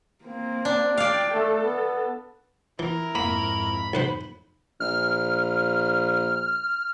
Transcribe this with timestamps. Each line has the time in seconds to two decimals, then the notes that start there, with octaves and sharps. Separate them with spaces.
0.24 A#3 C4
0.65 D4
0.98 D5 F5 G5
1.34 A3 A4
1.63 B3
2.79 E3 E4 A#4
3.15 F2 G#2 A#3 B5
3.93 B1 B4 C5
4.80 A#1 F6